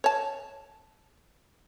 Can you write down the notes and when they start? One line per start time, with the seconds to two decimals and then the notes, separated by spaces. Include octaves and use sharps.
0.04 C#5 A5